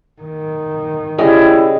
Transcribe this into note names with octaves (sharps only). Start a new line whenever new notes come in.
D#3
C#3 G3 E4 G#4 D#5